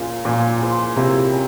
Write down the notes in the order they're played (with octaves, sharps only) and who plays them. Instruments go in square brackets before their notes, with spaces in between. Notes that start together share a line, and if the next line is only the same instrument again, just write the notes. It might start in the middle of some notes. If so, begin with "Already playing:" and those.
Already playing: [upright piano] A#2 [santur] G#3 C#4 F4 A#4
[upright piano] A#2 [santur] F3 A#3 C#4
[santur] E4 G#4 C5
[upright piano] C3 [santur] A#3 C#4 E4 G#4
[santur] G3 C#4